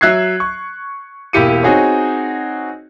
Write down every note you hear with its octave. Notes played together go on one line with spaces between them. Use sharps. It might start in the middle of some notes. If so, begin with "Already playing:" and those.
F#3 E5 F#6 G#6 C7
C#6
E1 A#3 E4 G4 C#7 D#7
C4 D#4 F#4 G#4 C#5